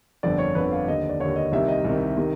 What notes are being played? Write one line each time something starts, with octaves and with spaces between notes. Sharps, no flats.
G1 F2 D3 D5
C#5
G1 F2 D3 B4
F5
D#2 D3 D#5
D5
D#2 D3 C#5
D#5
C2 C3 D#3 E5
D#5
C2 C3 D#3
C3 D#3